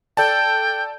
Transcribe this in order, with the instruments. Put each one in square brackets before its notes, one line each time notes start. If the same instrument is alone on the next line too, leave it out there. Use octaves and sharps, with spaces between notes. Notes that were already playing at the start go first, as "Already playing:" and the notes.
[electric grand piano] A4 D5 A5 [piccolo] G5